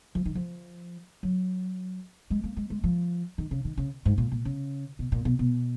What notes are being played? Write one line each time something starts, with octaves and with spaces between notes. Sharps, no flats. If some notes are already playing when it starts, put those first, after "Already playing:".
F3
D#3
F3
F#3
G#3
A#3
G#3
G#3
F3
D#3
C#3
D#3
C#3
G#2
A#2
A#2
C#3
B2
A#2
B2
B2